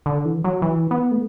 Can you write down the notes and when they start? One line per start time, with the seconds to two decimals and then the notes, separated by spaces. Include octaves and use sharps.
0.06 D3
0.25 E3
0.44 F#3
0.62 E3
0.91 B3
1.11 A3